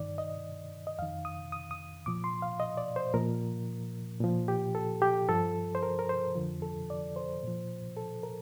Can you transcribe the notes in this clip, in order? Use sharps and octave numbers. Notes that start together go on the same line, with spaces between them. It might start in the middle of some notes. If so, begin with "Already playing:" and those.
Already playing: G2 D#3 D5
D#5
D#5
F2 D#3 F5
D#6
D#6
D#6
A#2 F3 D6
C6
F5
D#5
D5
C5
A#2 F3 A#4
A#2 F3
G4
A4
G4
G2 F3 A4
C5
A#4
A#4
C5
F2 D3 F3
A4
D5
C5
A#2 F3
A4
A#4